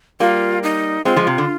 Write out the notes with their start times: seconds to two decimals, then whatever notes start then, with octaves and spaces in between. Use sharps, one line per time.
0.20 G3 A#3 F4
0.63 D#4
1.05 G#3 C4 F4
1.16 F3 G#3
1.27 C3
1.38 D3